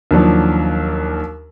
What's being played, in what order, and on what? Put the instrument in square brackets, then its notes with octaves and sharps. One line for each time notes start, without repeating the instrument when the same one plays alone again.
[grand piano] D#2 F3 F#3 D4